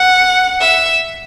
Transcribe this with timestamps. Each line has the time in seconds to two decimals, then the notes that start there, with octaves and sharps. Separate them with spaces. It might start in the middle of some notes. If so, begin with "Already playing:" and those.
Already playing: F#5
0.61 E5